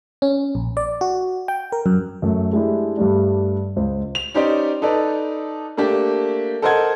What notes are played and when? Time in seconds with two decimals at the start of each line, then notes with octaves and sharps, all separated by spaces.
0.22 C#4
0.55 A#1
0.77 D5
1.01 F#4
1.48 G5
1.72 A#4
1.86 F#2
2.22 F#2 A3 F#4
2.53 G#3 A3 D4 E4 G4
2.97 G2 G3 A3 D4
3.76 C#2 C5
4.15 F7
4.34 C#4 D#4 G4 C5 D5
4.82 D#4 A4 B4 D5
5.77 A3 A#3 D4 G4
6.62 A4 A#4 C5 D#5 F#5 G#6